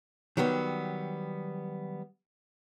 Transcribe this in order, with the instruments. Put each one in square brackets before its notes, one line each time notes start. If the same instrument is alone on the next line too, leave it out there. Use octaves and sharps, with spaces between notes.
[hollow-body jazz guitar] D#3 F#3 G3 B3